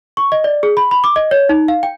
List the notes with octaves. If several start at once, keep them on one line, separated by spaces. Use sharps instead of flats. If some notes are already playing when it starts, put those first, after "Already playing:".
C#6
D#5
D5
G#4
B5
B5
D6
D#5
C#5
D#4
F5
G5